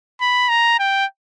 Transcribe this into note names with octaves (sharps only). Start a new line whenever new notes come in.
B5
A#5
G5